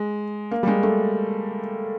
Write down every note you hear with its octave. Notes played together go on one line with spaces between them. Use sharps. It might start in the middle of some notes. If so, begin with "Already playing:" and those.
Already playing: G#3
A#3
G3
G#3
A3